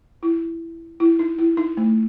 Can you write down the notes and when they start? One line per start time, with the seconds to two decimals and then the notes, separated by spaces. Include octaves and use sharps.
0.23 E4
1.00 E4
1.19 D#4
1.38 E4
1.57 D#4
1.77 A3